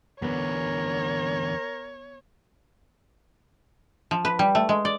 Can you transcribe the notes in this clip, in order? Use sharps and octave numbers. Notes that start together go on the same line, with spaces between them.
E2 D3 B3 A#4 C#5
F3
B4
G3
A3
G#3
D5